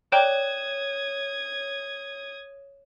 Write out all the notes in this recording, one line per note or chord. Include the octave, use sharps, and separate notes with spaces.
A#4 C#5 D5 G5 D#6 G#6